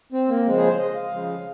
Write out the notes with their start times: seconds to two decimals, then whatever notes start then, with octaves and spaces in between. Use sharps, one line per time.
0.12 C4
0.29 A#3
0.45 C#3 F3 G#3 C4
0.57 G#4
0.68 C5
0.79 D#5
0.95 F5
1.12 C#3 F3 G#3